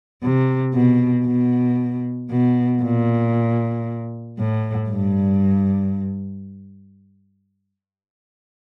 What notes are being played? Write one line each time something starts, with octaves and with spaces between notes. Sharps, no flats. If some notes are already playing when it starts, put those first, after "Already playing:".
C3
B2
B2
B2
A#2
A2
G2